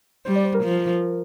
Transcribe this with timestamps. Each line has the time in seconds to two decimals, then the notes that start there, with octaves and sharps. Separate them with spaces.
0.25 G3 C5
0.36 D5
0.45 C5
0.54 A#4
0.63 F3